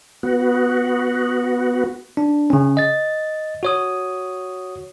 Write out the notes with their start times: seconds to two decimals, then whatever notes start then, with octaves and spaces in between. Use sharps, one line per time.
0.23 B3 F#4
2.17 D4
2.50 C#3 C#4
2.77 D#5 A6
3.63 F#4 C#5 D#6